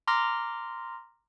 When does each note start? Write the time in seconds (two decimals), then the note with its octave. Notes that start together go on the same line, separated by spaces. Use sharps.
0.08 A#5 C6 D6 F6 A#6